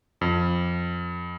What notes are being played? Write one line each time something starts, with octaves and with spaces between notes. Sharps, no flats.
F2